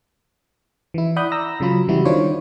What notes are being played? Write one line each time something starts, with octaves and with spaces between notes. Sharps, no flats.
E3 E4
D5 F#5 B5 D#6 F#6 G6
A#5 E6 A#6
C#3 F#3 F4 B5
C#3 E3 G3 E4 F#4
D#3 D4 F4 C5 C#5